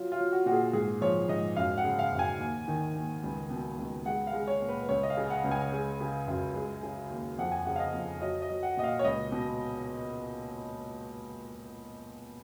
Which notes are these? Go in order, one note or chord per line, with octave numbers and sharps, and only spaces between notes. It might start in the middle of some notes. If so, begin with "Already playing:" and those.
Already playing: F#3 F4
F4
F#3
F#4
A#2 F#4
G#4
G#2 G#4
F3 C#5
G#2 D#5
F#2 F5
F#5
C#3
F5
F#2
G#5
D#2
D#3
D#2
C#2
B2
C#2
G#3 F#5
F5
G#3
C#5
A#2
B4
C#2 C#5
D#5
F5
C#3
F#5
C#2
G#5
G#3
C#3
F#2
G#3
C#3
D#2
F2 F#5
G#5
C#3 F#5
F5
D#5
F2
F#3 D#5
D#5
F#3
F#5
A#2 D#5
F5
C#5
C#2 D#5
B2